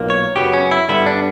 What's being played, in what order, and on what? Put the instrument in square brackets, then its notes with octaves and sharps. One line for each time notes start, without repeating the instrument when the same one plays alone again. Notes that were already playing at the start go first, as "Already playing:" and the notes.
Already playing: [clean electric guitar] B1 A#2 A#3
C#5
F#2 C#3 F#3 B3 G4
C#4
E4
G2 D3 G3 B3 E4
D4